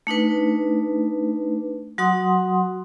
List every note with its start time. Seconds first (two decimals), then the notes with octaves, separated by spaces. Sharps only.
0.07 A3 D4 D#4 B4
1.98 F#3 F#4 F#5 C6 D#6